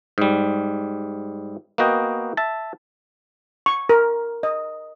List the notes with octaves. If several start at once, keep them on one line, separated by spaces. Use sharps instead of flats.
G#2 G3
A#3 B3 F#4 D#5 G5
E5 A5
C#6
A#4
D#5